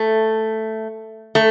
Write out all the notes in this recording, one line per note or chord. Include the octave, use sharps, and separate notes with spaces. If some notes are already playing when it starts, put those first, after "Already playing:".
Already playing: A3
A3